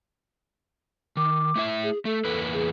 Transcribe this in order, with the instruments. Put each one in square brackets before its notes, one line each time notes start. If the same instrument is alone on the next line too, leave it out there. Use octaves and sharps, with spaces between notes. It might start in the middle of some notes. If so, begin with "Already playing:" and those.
[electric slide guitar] D#3 [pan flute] D6
[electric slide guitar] A3 E4 E5
[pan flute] G#4
[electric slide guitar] A3 [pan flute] A4
[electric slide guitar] E2 A#3 B4
[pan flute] G#4